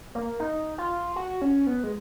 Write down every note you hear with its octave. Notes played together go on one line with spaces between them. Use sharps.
A#3
D#4
F4
F#4
C#4
B3
G#3